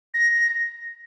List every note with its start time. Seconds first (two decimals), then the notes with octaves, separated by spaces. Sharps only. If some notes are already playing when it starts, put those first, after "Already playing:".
0.14 A#6
0.35 A#6